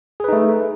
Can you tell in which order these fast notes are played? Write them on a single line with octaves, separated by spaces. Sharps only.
G#4 B4 D#4 A3